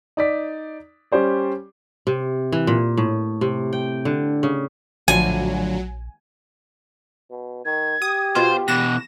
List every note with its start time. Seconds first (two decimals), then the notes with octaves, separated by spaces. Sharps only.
0.17 D#4 D5 B6
1.12 G3 C#4 G4 C5 D5
2.07 C3
2.52 E3
2.67 A#2
2.97 A2
3.41 C3
3.73 G5
4.05 D3
4.43 C#3
5.08 A#1 A2 D3 F3 F#3 G#5
7.31 B2
7.65 D#3 G#6
8.02 G4 D#6
8.35 B2 F4 C5
8.68 B2 E3 F#6 A#6 E7